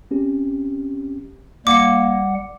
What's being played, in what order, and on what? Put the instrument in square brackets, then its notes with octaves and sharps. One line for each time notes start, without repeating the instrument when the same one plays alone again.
[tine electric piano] C4 C#4 G4
[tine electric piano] G1 [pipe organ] G3 F#5 [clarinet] A#3 [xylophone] D6 C#7